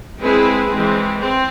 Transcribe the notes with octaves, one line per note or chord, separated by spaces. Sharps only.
G#3 C4 E4 G#4 B4
E3 G#3 C4
C4